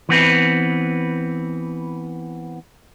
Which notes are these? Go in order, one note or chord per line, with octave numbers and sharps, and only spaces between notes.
E3 B3 C4 B4